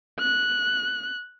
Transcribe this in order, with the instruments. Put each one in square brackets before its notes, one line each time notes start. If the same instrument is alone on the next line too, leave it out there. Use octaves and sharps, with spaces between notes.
[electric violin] F#6